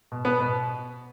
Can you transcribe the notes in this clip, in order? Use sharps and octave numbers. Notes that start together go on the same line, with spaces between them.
B2
B3
B2